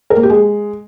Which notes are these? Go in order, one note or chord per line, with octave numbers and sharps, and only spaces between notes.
A#4
A#3
G4
G#3